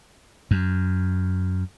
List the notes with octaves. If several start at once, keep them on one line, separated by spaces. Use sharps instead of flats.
F#2